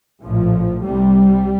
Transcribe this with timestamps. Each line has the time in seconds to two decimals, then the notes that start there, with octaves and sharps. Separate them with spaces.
0.23 A#1 A2 F3
0.83 C2 C3 G3